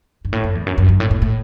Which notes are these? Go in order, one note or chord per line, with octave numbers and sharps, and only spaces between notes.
G2
A2
F#2
E2
F#2
F#2
G2
A2
A2
A2